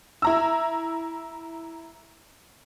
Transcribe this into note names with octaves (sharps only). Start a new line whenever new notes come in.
E4 A#5 E6